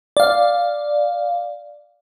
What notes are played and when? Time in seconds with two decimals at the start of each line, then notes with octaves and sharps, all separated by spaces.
0.17 D5 F5